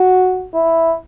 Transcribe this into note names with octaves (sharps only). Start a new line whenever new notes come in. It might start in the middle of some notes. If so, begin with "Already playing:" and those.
Already playing: F#4
E4